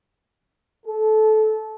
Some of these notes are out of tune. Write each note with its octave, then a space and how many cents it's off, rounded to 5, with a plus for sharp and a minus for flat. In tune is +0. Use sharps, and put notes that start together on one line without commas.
A4 -20